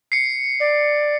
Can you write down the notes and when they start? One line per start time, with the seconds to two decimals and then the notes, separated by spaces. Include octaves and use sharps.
0.12 C7 C#7
0.60 D5